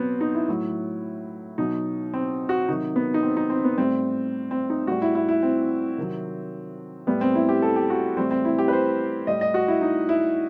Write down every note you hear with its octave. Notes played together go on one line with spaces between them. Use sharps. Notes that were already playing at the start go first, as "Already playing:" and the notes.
Already playing: B2 F#3 B3 C4
D#4
E4
A2 F#3
B2 F#3 D#4
C4
F#4
C3 D#3 F#3 D#4
B3
D#4
C4
D#4
C4
B3
A2 G3 C4
C4
D#4
A2 G3 F#4
E4
E4
E4
C4
C3 D#3 F#3
A2 G3 B3
C4
E4
G4
A4
G4
F#4
A2 E3 G3 C4
C4
E4
G4
B4
C5
A2 G3 D#5
D#5
F#4
E4
D#4
E4